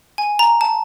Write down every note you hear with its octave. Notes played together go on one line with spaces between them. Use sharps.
G#5
A#5
A5